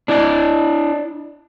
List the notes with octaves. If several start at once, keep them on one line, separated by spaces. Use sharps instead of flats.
D4 E4 D5 D#5